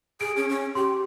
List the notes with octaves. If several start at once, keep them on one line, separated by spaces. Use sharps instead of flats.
G#4 D7
C#4
C#4
G4 C6